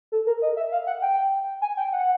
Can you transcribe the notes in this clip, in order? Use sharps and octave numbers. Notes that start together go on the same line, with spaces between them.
A4
A#4
D#5
E5
F5
F#5
G5
G#5
G5
F#5